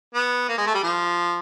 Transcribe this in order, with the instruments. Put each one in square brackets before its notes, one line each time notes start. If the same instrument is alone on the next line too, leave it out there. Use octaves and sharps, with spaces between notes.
[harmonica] B3
A#3
G#3
A3
G3
F3